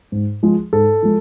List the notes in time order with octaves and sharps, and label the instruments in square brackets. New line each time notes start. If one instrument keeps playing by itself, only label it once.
[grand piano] G#2
F3 G#3
G#2 A4
F3 G#3